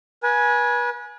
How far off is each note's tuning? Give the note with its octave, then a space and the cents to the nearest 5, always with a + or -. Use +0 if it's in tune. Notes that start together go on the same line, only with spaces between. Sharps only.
B4 -35 G#5 +10